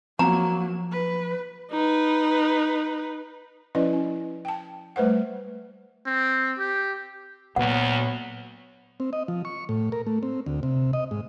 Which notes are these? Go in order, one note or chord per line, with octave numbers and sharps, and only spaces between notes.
F3 F#3 A#3 A#5
B4
D#4 B4
F3 C#4 E4 B4 D5 D#5
C#4
G5 A5
G3 A3 B4 C5 F#5
C4
G4
D2 A#2 F#3 B3 F#5
C4
D#5
F3
C#6
A2
A#4
A3
C4
D2
C3
D#5
G#2